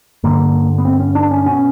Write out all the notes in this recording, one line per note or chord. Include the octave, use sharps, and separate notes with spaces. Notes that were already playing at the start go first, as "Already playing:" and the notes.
G2 D3 A#3
B3
C4
C#4
D4
C#4
B2 C#4